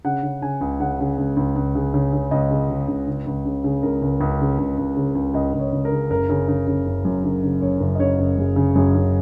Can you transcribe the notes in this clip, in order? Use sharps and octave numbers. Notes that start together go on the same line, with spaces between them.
C#3 F#5
C#3
C#3 G#5
C#2
C#3 F#5
C#3
C#2
C#2
C#2
C#3
C#3
C#3
C#2 D#5
C#3
C#3
C#2
C#3
C#2
C#3
C#3
C#2 A#4
C#2
C#2
C#3
C#2
C#2
C#3
C#2
C#2 D#5
C#2
C#5
C#2
A#4
C#3
F#1 A#4
C#3
C#3
C#3
F#1
F#2
C#3
C#3
F#1 C#5
F#1
D#5
C#3 C#5
F#1
F#2 G#4
C#3
F#2 G#4
C#3